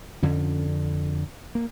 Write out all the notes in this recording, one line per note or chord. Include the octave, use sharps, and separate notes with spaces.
F2 D3 C#4
A#3